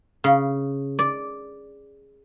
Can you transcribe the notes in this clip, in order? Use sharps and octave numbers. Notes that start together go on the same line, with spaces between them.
C#3
D5